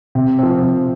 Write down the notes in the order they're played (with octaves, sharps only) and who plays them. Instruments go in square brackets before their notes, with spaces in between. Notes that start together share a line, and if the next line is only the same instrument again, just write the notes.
[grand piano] C3
F3 C4
C3